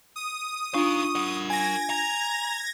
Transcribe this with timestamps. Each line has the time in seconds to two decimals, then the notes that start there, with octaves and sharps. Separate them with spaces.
0.16 D#6
0.74 D4 D#4 F4 F5 C#6
1.15 A#4 F#5
1.50 G#5 G#6 A#6
1.90 A#5